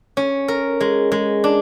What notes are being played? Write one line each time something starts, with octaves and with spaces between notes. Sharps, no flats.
C#4
A#4
G#3
G#3
D4